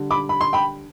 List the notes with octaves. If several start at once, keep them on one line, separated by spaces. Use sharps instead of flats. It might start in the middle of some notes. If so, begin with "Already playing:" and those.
Already playing: D3 G3
B5 D6
B5
C6
G5 B5